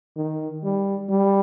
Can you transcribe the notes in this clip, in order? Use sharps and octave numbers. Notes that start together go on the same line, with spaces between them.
D#3
G3
G3